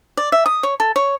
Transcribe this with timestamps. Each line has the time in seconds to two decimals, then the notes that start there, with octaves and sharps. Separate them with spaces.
0.17 D5
0.32 E5
0.46 D#6
0.63 C#5
0.80 A4
0.96 C#5